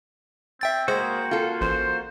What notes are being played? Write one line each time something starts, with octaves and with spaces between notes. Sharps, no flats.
C4 E5 G5 A6
G#3 A#3 F#4 C5 G5
F4 A4
A1 C5